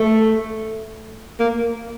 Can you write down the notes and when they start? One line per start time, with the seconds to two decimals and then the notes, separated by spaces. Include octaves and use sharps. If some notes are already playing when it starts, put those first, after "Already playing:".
Already playing: A3
1.40 A#3